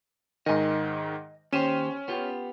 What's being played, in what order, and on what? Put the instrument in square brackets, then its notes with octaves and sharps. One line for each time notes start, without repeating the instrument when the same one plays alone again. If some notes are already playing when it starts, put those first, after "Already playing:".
[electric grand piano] G#2 D#3 [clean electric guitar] D#5 G#5
[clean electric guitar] D#2 G4 C5 [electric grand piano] C#4 D#7 E7
[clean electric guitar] B3 F4 G4